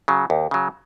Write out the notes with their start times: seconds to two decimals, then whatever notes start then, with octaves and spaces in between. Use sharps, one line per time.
0.08 C#3 F#3
0.30 D#2
0.51 C#3 F#3